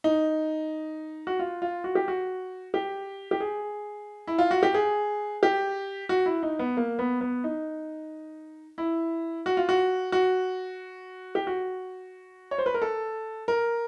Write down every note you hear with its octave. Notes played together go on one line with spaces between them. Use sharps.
D#4
F#4
F4
F4
F#4
G4
F#4
G4
G4
G#4
E4
F4
F#4
G4
G#4
G4
F#4
E4
D#4
B3
A#3
B3
B3
D#4
E4
F#4
F4
F#4
F#4
G4
F#4
C#5
C5
B4
A#4
A4
A#4